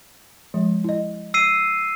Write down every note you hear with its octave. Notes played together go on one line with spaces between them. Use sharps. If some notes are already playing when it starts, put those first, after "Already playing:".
F3 G#3
E4 D#5
E6 C7 D#7